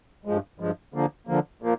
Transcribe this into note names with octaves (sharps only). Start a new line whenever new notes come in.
G2 F3 G#3
G2 F3 G#3
D3 F3 A#3
D3 F3 A#3
A#2 F3 A#3